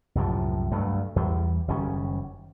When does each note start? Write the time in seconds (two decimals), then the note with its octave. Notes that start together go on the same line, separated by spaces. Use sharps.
0.15 C2 F#2 A2 F3
0.72 D2 G2 F#3 A3
1.16 E2 G3
1.68 F#1 D#3 G3 C#4